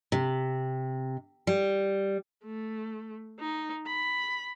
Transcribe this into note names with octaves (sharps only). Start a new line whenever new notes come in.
C3
G3
A3
D#4
B5